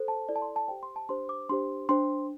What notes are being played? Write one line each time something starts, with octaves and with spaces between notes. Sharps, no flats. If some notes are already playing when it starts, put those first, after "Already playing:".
Already playing: A4 C5
A5
E4 A4 D5
A5
C6
A5
G4 C5 G5
C6
A5
D4 G4 C5 C6
D6
D4 G4 C5 C6
D4 C5 C6